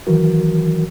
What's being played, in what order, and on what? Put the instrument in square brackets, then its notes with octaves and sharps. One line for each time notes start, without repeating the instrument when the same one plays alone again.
[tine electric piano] D#3 E3 F#3 F#4 A#4